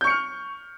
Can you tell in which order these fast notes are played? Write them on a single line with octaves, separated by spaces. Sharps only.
G6 C#6 C#7 F6